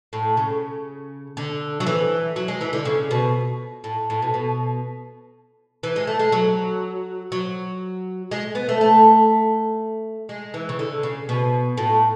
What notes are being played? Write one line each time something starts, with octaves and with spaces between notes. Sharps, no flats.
A2
C#3
D3
F#3
E3
F#3
G#3
E3
D3
C#3
B2
A2
A2
B2
B2
E3
G#3
A3
G#3
F#3
F#3
G#3
B3
A3
A3
G#3
E3
C#3
D3
C#3
B2
A2